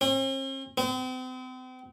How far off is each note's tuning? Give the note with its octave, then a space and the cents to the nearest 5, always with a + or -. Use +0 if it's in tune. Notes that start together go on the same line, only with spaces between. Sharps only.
C4 +45
C4 -40